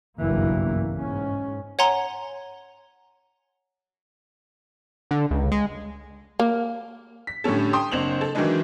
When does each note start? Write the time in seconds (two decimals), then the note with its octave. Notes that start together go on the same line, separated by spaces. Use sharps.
0.21 F#1 B1 G2 E3 A#3
0.98 G#2 C#4
1.79 C#5 F#5 G#5 A#5 C6
5.11 D3
5.31 C#2
5.52 G#3
6.39 A#3
7.27 B6
7.44 A2 D3 G3 C#4 A4
7.73 G5 C6 D#6
7.92 F#1 C4 D4 C5 F7 F#7
8.21 A4
8.35 D#3 E3 F#3 G#3 D4 D#4